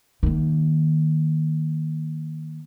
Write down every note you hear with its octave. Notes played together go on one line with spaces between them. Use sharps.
D#3 A#3